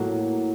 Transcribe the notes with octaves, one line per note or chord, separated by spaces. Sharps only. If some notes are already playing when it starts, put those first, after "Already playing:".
Already playing: A2 F#3 A#3